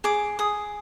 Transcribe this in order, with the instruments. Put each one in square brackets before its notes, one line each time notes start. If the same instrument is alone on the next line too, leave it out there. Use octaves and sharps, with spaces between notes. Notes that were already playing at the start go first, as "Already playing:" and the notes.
[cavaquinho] G#4 D6
G#4 D#6